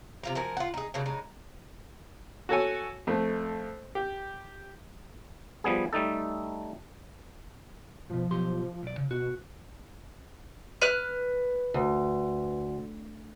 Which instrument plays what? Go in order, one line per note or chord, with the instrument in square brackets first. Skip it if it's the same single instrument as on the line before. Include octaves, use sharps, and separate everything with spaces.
[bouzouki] C3 F4 A#5
F3 F#4 A#4 G#5
F4 F#5
D#4 G#4
C#3 A#3 D4 F#4
C#3 G#3 D#4
[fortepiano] F#4 A4 C#5 G#5
F2 A3
G4
[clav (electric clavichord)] F3 G3 B3 G#4
G3 A3 D#4 A4
[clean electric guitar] G2 B2 [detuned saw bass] F3
[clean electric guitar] B1 G4 C6
B1 D5
C#3
[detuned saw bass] B2 [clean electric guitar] F#4
[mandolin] B4 F6 F#6
[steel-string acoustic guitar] D2